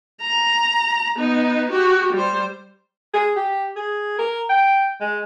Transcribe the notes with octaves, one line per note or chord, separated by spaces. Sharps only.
A#5
B3 D#4
F#4 G4
G3 C5
G#4
G4
G#4
A#4
G5
G#3